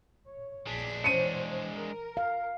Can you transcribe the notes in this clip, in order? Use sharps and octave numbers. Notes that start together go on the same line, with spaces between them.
C#5
A#1 G#3 D4 B6
E3 C5 C#5 C#7 D#7
A#4
F5